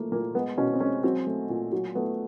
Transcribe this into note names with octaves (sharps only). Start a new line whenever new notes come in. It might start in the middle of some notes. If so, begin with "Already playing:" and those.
Already playing: F3 A3 A#3
A#2 A#3
G#3 B3
B2 C#4
C4
G#3 C#4
F#3 C4
A3
A#2
F#3
A3 B3